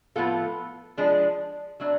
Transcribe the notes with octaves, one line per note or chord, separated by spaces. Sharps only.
A2 F3 B3 F4 A4
F3 G#3 D4 G#4
F#3 A3 D4